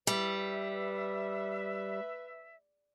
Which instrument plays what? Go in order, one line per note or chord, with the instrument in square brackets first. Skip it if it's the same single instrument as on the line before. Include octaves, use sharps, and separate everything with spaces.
[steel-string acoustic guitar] G3 [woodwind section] B4 E5